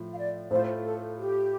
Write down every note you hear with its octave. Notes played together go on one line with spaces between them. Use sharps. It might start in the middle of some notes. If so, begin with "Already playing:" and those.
Already playing: A2 F3
F5
D5
A2 A3 F4 C5
A4
G4